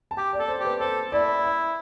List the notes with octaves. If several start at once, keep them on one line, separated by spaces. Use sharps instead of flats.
A5
G4 G5
D5
A4
C5
G4 B4
A4 C5
E4 D5
E5